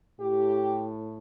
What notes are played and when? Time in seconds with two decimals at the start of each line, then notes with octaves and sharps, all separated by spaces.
0.20 A2 G4